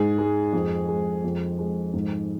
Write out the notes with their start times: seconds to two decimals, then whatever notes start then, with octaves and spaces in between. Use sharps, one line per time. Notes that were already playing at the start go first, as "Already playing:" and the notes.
Already playing: G#2 G#4
0.18 G#3
0.53 F2
0.89 G#3
1.24 F2
1.59 G#3
1.94 G#2